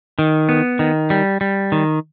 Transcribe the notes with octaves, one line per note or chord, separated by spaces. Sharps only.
D#3
B3
D#3
G3
G3
D#3